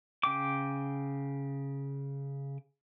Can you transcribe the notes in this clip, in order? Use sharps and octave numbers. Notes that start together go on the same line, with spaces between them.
C#3 G5 D6